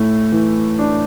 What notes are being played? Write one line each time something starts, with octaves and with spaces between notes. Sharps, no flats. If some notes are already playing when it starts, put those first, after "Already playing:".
Already playing: A2 A3
E3
D4